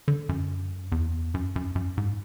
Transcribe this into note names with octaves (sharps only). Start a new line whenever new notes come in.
D3
F#2
E2
F#2
F#2
F#2
G#2